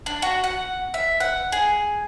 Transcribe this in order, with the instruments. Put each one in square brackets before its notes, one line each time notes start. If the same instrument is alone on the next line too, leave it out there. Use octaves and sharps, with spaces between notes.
[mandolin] D4
F#4
F#5
E5
F#5
G#4